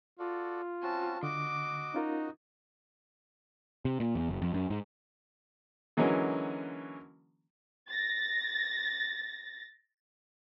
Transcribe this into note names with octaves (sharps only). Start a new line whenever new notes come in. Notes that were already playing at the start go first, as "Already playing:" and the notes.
F4 F#4 A4 D5
C4 C#4 F#4 A5
D3 F#4 D#5 D6
C#4 D#4 F4 A#4
C3
A#2
E2
F#1
F2
F#2
G#2
D3 E3 F#3 G#3 A#3 C#4
A6 A#6